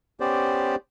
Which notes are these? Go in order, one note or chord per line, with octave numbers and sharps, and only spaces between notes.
B3 C#4 G4 C5 D5